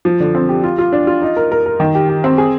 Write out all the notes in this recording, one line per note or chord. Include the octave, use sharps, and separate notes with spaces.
F3
D3
C4
G4
F4
F4
D4
F4
D#4
A#4
A#4
A#4
D#3
G4
G4
C4
G#4